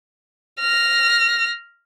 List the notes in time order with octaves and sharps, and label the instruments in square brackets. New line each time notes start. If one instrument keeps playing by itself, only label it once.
[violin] F6 A#6